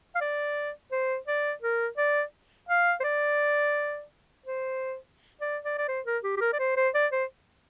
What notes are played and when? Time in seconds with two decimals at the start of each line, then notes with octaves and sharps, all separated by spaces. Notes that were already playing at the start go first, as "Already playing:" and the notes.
0.16 F5
0.21 D5
0.92 C5
1.27 D5
1.62 A#4
1.98 D5
2.69 F5
3.00 C5
3.04 D5
4.46 C5
5.41 D5
5.65 D5
5.78 D5
5.88 C5
6.06 A#4
6.24 G4
6.37 G4
6.41 A#4
6.53 D5
6.59 C5
6.77 C5
6.95 D5
7.12 C5